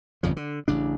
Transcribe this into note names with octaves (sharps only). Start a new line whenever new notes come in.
G1 F2 C#3 F3
D3
A1 C#3 D4